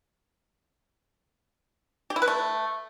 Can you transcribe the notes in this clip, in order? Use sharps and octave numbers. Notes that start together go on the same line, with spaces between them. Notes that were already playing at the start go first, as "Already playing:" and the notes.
G4
E4
B4
A3